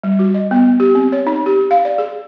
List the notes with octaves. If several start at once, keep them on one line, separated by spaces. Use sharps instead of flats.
G3
F#4
D#5
B3
G4
C4
C#5
D#4
G4
F5
D5
G#4